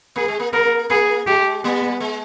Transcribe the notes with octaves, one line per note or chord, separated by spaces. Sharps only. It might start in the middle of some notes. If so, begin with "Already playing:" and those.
A#3 G#4
G#3
A#3
A#3 A#4
A#3 G#4
G#3 G4
G3 B3
G#3